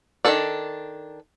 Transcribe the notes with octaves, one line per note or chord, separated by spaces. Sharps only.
D#3 F3 D4 A4 D5